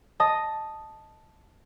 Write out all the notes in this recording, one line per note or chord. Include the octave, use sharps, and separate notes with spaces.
D#5 A5 D#6